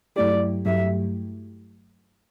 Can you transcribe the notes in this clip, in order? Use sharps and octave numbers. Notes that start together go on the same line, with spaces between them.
G2 F#3 A3 E4 G4 D5
G2 F#3 A3 E4 G4 E5